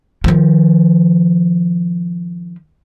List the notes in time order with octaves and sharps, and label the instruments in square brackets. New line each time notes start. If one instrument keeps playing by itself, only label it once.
[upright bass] D#3 F3